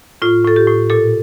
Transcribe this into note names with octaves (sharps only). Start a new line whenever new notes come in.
A2 F4
A2 A4
G4
A2
A#2 A4